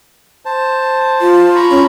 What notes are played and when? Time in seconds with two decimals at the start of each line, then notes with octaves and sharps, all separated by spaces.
0.45 C5 A5
1.21 F4
1.55 A#5 B5 C#6
1.70 C#4